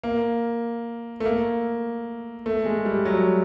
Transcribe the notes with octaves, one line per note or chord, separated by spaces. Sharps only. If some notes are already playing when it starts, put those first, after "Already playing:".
A#3
A3
A#3
A3
G#3
G3
F#3